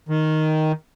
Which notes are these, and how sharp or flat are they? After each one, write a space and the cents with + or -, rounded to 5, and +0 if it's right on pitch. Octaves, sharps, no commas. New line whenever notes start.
D#3 +5